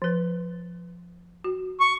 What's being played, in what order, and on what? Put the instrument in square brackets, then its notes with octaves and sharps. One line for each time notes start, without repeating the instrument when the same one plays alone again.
[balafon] F3 B4
F#4
[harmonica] C#6